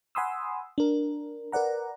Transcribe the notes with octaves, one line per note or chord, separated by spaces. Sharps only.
F#5 G#5 B5 C6 D#6 E6
D4 A#4
A#4 B4 D5 F#5 A#5